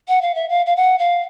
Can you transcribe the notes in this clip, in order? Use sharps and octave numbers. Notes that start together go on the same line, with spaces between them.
F#5
F5
E5
F5
F5
F#5
F5